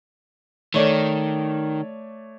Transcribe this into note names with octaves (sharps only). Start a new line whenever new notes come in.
D#3 A3 C#5 D5